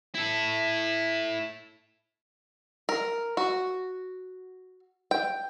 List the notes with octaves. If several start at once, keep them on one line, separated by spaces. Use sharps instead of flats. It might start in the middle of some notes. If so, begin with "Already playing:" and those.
E4 A4
A#4
F#4
G5